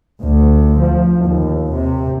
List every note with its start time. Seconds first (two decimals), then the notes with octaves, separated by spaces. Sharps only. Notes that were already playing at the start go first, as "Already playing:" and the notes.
0.22 D2
0.80 F3
1.25 D#2
1.73 C3